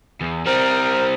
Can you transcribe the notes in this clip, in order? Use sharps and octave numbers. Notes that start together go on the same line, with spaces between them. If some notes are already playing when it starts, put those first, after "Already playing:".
E2
G3 C4 A#4 C5